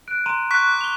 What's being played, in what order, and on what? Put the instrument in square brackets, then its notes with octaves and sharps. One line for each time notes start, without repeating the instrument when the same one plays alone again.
[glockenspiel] F#6 D7
A#5 C6 D#7
[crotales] C#6 F#6 B6
[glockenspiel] D6
F7 G7